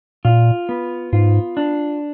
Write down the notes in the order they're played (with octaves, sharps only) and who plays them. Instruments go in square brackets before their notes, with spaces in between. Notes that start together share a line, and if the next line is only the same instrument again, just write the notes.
[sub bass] A#2 [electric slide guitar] F4
[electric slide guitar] B3
[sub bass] G#2 [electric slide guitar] F4
[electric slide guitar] D4